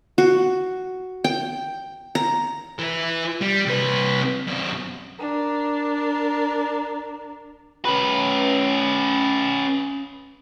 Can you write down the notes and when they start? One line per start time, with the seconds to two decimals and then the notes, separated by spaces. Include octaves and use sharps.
0.18 F#4
1.24 G5
2.15 A#5
2.79 E3 E4
3.41 G3
3.66 C2 B4
4.48 F#2 B3
5.19 D4 A#4
7.85 C#4 B4